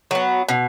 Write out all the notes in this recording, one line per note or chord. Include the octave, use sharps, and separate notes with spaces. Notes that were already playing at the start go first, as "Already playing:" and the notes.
F#3 B3
B2